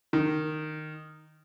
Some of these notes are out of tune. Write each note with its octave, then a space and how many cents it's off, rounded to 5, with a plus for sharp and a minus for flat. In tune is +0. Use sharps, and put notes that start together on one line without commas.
D#3 -10